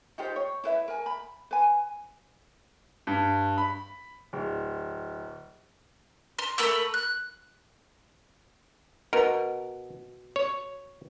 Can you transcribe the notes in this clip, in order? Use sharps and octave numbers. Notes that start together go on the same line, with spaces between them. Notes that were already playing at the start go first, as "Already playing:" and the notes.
D#4 F4 G4 C5
C#5
E4 B4 E5
A#4 G#5
B5
B4 G#5
G2
B5
D1
C6
A3 A#4 B5 E6
F#6
B2 A#4
C#5